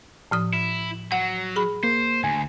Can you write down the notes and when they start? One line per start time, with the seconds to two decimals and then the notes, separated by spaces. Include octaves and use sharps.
0.31 A2 F3 D#6
0.53 E4
1.12 F#3 F#5
1.56 G#4 B5
1.83 A#3 C5
2.24 D2 G#5